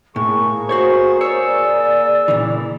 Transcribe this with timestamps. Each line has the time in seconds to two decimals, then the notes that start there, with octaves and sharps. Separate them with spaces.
0.16 A2 A#3 G#4 C#6
0.69 F#4 A4 C5 C#5
1.21 C#5 D5 E6
2.28 A#2 C#3 E3